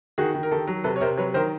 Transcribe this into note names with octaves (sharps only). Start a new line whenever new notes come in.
D#3 F#4 G#4
D#3
A#4
D#3 G4 A4
F#3
C3 A4 B4
C#5
C3 A#4 C5
F#3 B4 C#5
D#3 A#4 C5